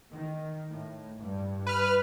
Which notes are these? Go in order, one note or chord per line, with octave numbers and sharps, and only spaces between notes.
D#3
A2
G2
B4 F6